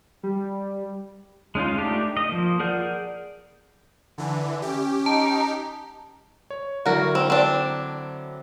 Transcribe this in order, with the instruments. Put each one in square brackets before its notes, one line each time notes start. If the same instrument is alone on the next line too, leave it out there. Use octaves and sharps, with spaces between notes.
[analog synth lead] G3
[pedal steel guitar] G#3 C#4 D#4 F4
A3 D4 D#4 G4
D#5
F3 A#3
G#4 A#4 D5 F#5 G6
[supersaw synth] D3 E3
[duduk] C#4 [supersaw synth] G4
[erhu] D#4 [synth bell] A5
[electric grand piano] C#5
[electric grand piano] D3 F#3 E4 [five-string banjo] F#4 A#4
[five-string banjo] C4
C4 D4